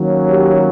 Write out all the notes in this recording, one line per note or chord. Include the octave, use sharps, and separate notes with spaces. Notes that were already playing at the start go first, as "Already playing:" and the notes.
Already playing: D#3 F#3 A#3 C#4
G4